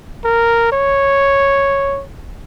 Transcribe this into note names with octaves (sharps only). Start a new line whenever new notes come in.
A#4
C#5